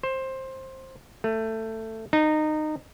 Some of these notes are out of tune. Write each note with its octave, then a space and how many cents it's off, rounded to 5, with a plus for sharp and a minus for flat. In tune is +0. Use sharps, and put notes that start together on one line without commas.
C5 +15
A3 +15
D#4 -20